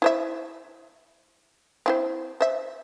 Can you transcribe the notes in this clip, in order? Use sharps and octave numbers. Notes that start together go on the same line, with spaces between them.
E4 C5 E5
C4 E4 C5
C5 E5